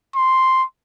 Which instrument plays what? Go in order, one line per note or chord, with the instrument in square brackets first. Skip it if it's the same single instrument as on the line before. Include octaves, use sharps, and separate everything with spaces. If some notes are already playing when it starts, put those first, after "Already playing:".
[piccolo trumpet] C6